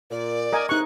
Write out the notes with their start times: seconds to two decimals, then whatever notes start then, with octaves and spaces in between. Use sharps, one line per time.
0.11 A#2 D5
0.53 A#4 D#5 G#5
0.69 E2 C3 D#4 C#6 F#6